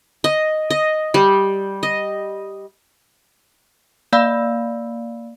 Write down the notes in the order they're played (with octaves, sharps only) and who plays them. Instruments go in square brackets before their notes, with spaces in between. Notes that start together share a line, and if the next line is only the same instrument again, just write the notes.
[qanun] D#5
D#5
G3
D#5
[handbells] A#3 D5 F5 B5 E6